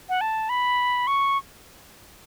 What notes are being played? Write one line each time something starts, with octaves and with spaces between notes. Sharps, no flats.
F#5
A5
B5
C#6